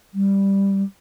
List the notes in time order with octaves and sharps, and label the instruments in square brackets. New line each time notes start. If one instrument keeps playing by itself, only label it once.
[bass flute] G3